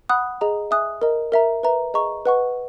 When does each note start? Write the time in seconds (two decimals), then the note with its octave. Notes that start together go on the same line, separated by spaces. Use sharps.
0.09 F#5 B5 D#6 F#6
0.41 G#4 D#5 A#5
0.71 E5 G#5 D#6 F#6
1.02 A#4 D#5 A#5
1.32 A#4 E5 A#5
1.63 B4 E5 A#5
1.94 G#4 D#5 A#5 C#6
2.25 B4 D#5 F#5 C#6